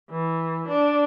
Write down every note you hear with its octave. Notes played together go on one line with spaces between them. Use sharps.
E3
D4